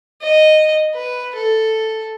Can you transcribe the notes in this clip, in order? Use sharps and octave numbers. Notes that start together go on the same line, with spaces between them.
D#5
B4
A4